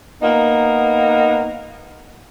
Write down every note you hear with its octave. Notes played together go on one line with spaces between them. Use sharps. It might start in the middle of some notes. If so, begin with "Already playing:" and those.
A#3 B3 D#4